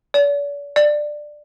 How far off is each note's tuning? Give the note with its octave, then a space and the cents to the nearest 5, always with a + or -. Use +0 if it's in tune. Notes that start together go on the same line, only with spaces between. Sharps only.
D5 -45
D5 +15